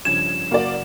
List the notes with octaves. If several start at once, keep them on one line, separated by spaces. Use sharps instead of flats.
G2 C#3 F3 G#6 E7
F#1 A#3 F#4 D5